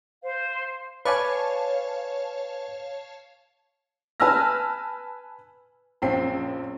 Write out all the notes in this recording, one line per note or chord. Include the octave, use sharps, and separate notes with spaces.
C5 F5
B4 C#5 D5 F5 G#5 A5
B4 G#5 A5 E6 F6 A#6
A#1 F#2 C4 G5 C7